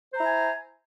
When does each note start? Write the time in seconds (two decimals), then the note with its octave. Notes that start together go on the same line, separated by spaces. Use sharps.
0.13 C5
0.17 A#5
0.21 E4
0.24 G#5